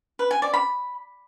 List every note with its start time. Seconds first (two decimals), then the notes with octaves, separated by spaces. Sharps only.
0.19 B4
0.31 G#5
0.42 D5
0.53 B5